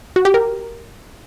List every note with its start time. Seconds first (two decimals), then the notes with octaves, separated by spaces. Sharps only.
0.16 F#4
0.25 G4
0.34 A#4